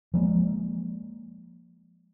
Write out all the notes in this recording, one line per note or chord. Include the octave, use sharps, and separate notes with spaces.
F3 G#3 A#3